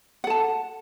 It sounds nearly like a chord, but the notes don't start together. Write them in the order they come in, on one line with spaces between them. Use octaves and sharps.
F#5 A4 A5